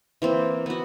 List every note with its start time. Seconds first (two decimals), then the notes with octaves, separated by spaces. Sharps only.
0.22 E3 A#3 C4
0.66 B3 F#4